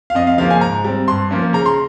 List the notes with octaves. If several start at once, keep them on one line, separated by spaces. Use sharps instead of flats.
F5
F2 D#5
F5
C#3 F3 A#3 C#4 F5
G#5
G#2 A#5
G3 C4
G2 C6
F3 A#3 C#4
C#3 A#5
C6